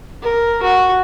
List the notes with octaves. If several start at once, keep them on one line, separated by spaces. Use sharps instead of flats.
A#4
F#4